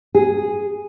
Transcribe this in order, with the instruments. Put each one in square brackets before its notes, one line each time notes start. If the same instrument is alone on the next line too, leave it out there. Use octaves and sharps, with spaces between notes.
[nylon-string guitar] G#4